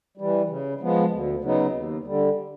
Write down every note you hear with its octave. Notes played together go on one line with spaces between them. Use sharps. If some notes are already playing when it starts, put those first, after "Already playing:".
E3 G3
C#3
F3 G#3 B3
D2
C#3 F#3 B3 D#4
D#2
D3 G3